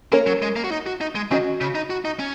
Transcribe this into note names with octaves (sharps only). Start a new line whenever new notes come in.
A#3 C#4 A#4 C#5
F#3
G#3
A#3
F#4
D#4
F#4
D#4
G#3
D#3 C#4 F#4 D#5
C#3
D#4
F#4
D#4
C#4